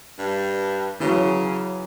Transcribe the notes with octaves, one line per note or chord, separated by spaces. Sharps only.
G2
C#3 E3 F#3